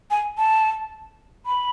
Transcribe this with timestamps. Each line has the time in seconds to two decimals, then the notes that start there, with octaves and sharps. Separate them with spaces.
0.11 G#5
0.38 A5
1.46 B5